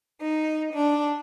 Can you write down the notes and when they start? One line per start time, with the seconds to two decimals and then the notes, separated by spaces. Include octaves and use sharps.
0.23 D#4
0.73 D4